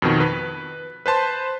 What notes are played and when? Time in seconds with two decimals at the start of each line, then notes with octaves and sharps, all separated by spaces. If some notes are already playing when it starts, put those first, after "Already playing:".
0.02 F2 B2 D#3
0.20 B4
1.06 B4 C5 A5 C6